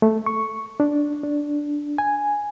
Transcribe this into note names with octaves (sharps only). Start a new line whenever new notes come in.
A3
C#6
D4
D4
G#5